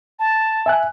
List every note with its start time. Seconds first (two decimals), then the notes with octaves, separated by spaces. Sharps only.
0.19 A5
0.66 E5 G#5 F#6